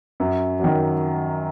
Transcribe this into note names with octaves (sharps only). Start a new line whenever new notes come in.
F#2
D#3 F#3